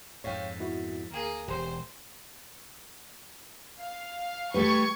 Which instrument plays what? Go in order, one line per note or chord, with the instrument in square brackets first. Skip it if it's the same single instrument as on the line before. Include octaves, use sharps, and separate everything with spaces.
[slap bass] F2 G#2 [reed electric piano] C#5 F5 G5
[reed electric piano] B3 E4 F#4
[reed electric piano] D2 [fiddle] A#3 G#4
[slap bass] E1 [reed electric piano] G4 [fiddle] C5
[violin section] F5
[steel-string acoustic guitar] A3 G4 B4 [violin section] C#6 G#6